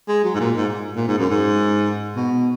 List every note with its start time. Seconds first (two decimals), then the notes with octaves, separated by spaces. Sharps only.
0.08 G#3
0.24 F#3
0.35 G#2
0.40 A#2
0.56 G#2
0.96 A#2
1.08 G#2
1.19 F#2
1.30 G#2
2.16 B2